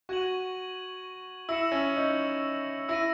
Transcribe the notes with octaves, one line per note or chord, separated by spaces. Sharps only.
F#4 C#6 G#6 D#7 F#7
E4 E6 A#6 C#7 E7
C#4
D#4
E4 E6 A#6 D#7